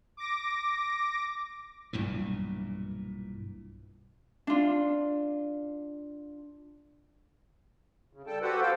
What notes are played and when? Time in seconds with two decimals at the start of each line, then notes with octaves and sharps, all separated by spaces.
0.17 D6 A#6
1.93 B1 G2 A#2 E3
4.47 D4 F4
8.13 C#3
8.27 G3 A4 G5 A5
8.42 F#4 G4 A4 B4 C5 F#5
8.61 A4 C5 F5 G5